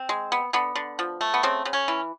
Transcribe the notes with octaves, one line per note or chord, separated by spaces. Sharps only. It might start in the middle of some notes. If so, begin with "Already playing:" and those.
Already playing: C4
G#3
B3
D3 B3
D3
F3
A3
B3
C#3 C4
C#3
C#4
E3